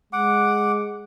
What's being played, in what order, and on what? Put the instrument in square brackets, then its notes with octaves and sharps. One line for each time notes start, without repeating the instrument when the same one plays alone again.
[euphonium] G#3 [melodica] F#5 D6